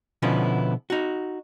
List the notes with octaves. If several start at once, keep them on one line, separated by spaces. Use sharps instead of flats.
B2 D3 F3 B3 C#4 E4
D#4 F#4